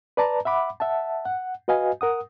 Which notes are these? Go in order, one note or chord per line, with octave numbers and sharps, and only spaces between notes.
B4 D5 A5 A#5
E5 F#5 B5 D6
E5 F#5 A5
F#5
F#4 B4 D#5 F5 G#5
A#4 F#5 D#6